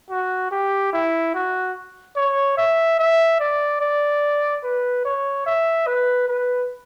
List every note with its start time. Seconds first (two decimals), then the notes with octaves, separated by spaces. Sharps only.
0.10 F#4
0.51 G4
0.93 E4
1.35 F#4
2.16 C#5
2.58 E5
2.99 E5
3.40 D5
3.81 D5
4.63 B4
5.05 C#5
5.46 E5
5.87 B4
6.28 B4